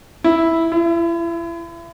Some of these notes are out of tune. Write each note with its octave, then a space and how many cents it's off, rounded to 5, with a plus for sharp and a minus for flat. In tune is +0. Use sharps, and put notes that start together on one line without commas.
E4 -5
E4 +35